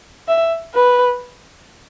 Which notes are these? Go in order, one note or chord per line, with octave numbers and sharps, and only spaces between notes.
E5
B4